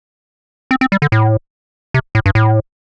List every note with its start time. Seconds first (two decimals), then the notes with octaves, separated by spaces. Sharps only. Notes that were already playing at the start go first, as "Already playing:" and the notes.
0.71 C4
0.81 C4
0.92 G3
1.02 D3
1.12 A2
1.94 C3
2.15 A2
2.26 G2
2.35 A2